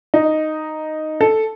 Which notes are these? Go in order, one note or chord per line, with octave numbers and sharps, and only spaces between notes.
D#4
A4